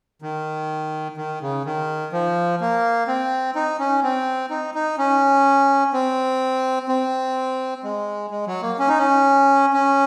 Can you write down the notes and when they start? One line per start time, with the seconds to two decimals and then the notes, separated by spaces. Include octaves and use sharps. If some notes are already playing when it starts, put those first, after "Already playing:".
0.22 D#3
1.17 D#3
1.41 C#3
1.65 D#3
2.13 F3
2.61 A#3
3.08 C4
3.55 D#4
3.79 C#4
4.03 C4
4.50 D#4
4.74 D#4
4.98 C#4
5.93 C4
6.88 C4
7.84 G#3
8.31 G#3
8.47 F#3
8.62 A#3
8.79 C#4
8.89 D#4
8.98 C#4
9.73 C#4